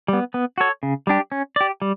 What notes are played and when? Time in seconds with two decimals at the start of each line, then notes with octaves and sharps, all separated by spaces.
0.08 G3 B3
0.34 B3
0.58 F#4 A4 C#5
0.83 C#3
1.07 G3 D4 G4
1.32 C#4
1.56 G4 D5
1.82 G3